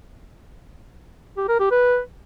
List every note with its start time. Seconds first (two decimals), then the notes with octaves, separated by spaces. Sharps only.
1.37 G4
1.49 A#4
1.60 G4
1.71 B4